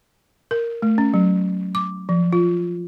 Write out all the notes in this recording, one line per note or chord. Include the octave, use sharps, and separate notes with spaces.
A#4
A3
C#4
F#3
D6
F3
F4